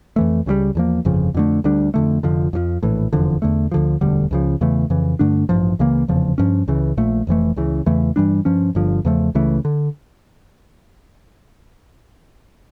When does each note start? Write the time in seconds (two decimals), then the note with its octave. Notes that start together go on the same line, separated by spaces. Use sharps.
0.16 F2 E3 A3
0.46 C#2 C#3 E3 G3
0.75 E2 D3 F3 A#3
1.05 G1 F2 C#3 F3
1.34 F2 D3 A3
1.64 D2 D3 G3 D4
1.94 F2 D3 A3
2.23 F1 F2 D3 F3
2.53 F2 D3 F3
2.83 A#1 A2 E3
3.13 F1 E2 D3 F3
3.42 E2 D3 A3
3.71 D2 D3 F3
4.01 E1 D2 D3 G3
4.31 C#2 C#3 F3
4.61 E2 C#3 E3 A3
4.90 F2 C#3 E3
5.19 G2 D3 A3 D4
5.49 A1 G2 F3
5.79 C#2 C#3 E3 A#3
6.08 F1 E2 C#3 F3
6.38 G2 F3 C#4
6.68 C#2 C#3 E3
6.97 A#1 A#2 A3
7.27 F1 F2 E3 A3
7.56 C#2 C#3 E3
7.86 E2 C#3 E3 A3
8.16 G2 E3 G3 D4
8.45 G2 F3 C#4
8.75 G1 G2 D3 F3
9.05 E2 C#3 F3 A3
9.35 C#2 C#3 E3 A3
9.65 D3